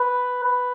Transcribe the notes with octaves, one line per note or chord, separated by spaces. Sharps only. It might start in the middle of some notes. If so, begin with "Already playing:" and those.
Already playing: B4
B4